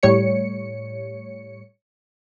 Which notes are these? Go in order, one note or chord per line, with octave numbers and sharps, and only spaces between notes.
A2 G3 C#5 C#7